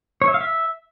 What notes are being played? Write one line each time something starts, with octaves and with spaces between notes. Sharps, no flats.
C#5
E5
F5
E5